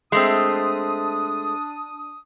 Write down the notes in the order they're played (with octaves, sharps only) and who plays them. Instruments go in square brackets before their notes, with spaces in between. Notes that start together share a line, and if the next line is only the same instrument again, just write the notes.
[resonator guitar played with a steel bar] G#3 A3 C4 [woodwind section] D4 D#6